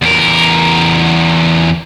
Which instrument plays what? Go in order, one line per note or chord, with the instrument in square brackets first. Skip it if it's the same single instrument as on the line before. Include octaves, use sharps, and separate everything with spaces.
[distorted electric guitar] E2 A#4